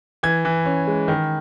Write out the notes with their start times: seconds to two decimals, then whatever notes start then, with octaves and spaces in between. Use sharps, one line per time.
0.23 E3 G#6
0.45 E3
0.66 C#4
0.87 G#3
1.08 D#3